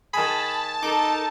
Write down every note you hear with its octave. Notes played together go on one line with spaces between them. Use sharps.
D#3 G#4 A5 B5
D#4 A4 A#4 D6